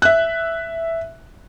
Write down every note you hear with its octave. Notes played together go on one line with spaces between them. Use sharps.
E5 F#6